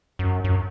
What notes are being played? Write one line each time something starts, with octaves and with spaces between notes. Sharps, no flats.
F#2
F#2